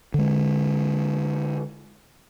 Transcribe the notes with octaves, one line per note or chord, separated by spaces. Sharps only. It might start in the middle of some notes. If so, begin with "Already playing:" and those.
D3 G#3